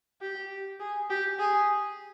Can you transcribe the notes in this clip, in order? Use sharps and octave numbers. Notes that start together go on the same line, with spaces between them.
G4
G#4
G4
G#4